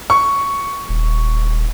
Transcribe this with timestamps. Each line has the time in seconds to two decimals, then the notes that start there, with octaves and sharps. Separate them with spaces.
0.10 C#6
0.89 D#1